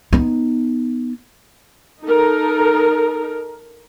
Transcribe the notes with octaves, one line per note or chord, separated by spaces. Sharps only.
B3 D#4
D#4 A4 A#4